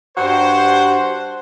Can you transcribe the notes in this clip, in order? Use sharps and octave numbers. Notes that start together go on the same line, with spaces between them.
G2 F#4 C5